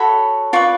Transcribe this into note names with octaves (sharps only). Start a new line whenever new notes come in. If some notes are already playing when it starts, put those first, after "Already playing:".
Already playing: F#4 A4 C#5 B5
F4 B4 D5 C#6